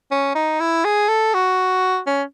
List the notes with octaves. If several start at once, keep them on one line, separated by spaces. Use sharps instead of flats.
C#4
D#4
E4
G#4
A4
F#4
C#4